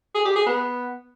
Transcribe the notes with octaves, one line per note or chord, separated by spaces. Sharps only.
G#4
G4
G#4
B3